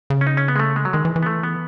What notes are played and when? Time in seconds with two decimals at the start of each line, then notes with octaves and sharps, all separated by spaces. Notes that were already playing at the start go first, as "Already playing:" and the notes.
0.10 C#3
0.21 C#4
0.27 D#4
0.37 C#4
0.48 B3
0.56 G#3
0.59 A3
0.76 G#3
0.85 F#3
0.93 D#3 G#3
1.05 E3
1.16 E3
1.23 B3
1.26 A3
1.43 B3